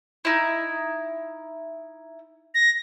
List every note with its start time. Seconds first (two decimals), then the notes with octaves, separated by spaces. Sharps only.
0.25 D#4 E4
2.54 A#6